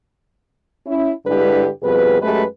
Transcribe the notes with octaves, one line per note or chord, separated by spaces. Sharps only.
C#4 E4
G2 D3 G#3 E4 G4 B4
F2 B2 G3 G#4 B4
F#2 G#3 A3 G4 B4